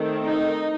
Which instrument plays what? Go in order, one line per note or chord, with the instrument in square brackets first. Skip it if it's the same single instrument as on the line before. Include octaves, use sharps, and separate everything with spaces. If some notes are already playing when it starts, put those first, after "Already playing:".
Already playing: [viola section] D#3 A3 C4
D#4